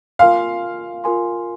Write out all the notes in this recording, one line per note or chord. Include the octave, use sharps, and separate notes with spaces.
F4 A#4 F5 G#5 C6
F4 A#4 G#5 C6